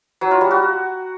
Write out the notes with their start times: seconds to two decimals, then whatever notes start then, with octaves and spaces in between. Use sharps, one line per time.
0.21 F#3
0.31 F4
0.41 G3
0.51 F#4